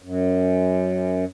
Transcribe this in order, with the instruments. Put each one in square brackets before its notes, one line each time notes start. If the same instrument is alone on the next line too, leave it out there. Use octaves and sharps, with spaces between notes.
[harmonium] F#2